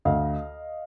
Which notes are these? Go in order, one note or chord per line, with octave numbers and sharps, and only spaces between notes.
D2 D#5 F5